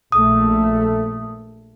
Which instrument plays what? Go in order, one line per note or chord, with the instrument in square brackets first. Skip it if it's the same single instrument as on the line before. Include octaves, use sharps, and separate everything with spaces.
[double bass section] A#1 A3 [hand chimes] D#6